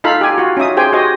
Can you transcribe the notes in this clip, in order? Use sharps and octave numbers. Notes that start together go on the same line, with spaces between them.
D#4 F4 A4 F5 B5
G4 G#5
F4 F#4
C#4 D#4 E5 D#6
G4 G#4 C5 G5 G#5
F#4 G4 C5 D#5 G#5